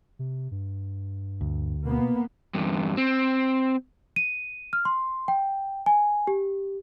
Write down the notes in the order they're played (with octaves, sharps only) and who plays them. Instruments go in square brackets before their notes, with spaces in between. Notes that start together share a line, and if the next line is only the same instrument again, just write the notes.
[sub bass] C3
G2
[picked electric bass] D2
[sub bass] B2 [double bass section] A#3 B3
[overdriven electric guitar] E2 G2
C4
[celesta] D#7
F6
C6
G5
G#5
G4